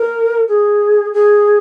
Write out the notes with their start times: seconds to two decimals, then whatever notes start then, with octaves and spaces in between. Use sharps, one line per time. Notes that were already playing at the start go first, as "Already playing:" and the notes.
Already playing: A#4
0.49 G#4
1.13 G#4